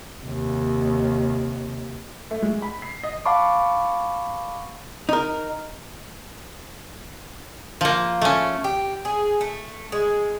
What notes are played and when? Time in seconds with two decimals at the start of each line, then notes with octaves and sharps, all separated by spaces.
0.22 D#2 C3
2.31 A3
2.42 G#3
2.62 B5
2.82 C7
3.03 D#5
3.25 F5 F#5 A5 B5 C#6 D6
5.09 D#4 A#4
7.81 F3 A#3
8.21 A3 C#4
8.64 G4
9.05 G#4
9.41 A3
9.92 G#3